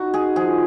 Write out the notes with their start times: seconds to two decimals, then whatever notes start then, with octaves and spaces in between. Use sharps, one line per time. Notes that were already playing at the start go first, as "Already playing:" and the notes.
Already playing: D#4 F#4
0.14 G#4
0.36 F3 G#4